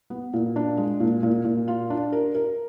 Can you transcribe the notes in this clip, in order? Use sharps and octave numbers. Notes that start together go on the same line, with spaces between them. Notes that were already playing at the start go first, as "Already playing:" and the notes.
B3
A#2
D4
G#3
A#2
A#2
A#2
F4
D4
A#4
A#4